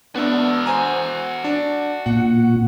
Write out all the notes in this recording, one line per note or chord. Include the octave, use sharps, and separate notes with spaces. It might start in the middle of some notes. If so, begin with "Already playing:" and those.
B3 D4 F#4 E5
C5 G#5 A#5
D4
A#2 F#5